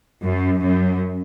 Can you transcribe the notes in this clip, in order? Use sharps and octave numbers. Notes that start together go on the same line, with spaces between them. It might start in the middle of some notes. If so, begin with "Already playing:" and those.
F#2
F#2